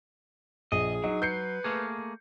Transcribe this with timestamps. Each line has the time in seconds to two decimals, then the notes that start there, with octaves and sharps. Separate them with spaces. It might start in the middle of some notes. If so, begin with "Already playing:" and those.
0.72 A#1 G#4 D#5
1.04 F#3 D#4
1.22 B4 G6 C7 C#7
1.64 A3 A#3 G#4